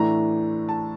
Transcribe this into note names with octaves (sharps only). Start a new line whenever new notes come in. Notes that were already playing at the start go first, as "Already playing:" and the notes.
Already playing: A2 E3 A3 D4 A#5
A5